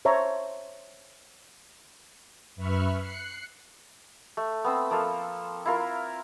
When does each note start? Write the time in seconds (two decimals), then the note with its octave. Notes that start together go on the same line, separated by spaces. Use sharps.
0.05 C5 C#5 E5 A5 A#5 C6
2.56 F#2 B4 E5 B5 C#6 F6
2.98 F#6 C7 C#7
4.37 A3
4.64 B3 C4 E6
4.91 F3 A#3 F4 A4
5.66 E4 F4 A#4